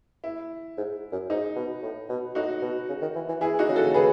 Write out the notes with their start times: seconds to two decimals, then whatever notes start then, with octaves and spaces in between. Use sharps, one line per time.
0.24 E4
0.78 G#2
1.12 F#2
1.30 G#2 D#4
1.56 B2
1.82 A2
2.09 B2
2.35 A2 D#4 F#4
2.62 B2
2.88 C#3
3.01 D#3
3.15 E3
3.28 E3
3.41 E3 E4 G#4
3.59 D#4 F#4
3.68 C#3
3.76 F#4 A4
3.94 G#4 B4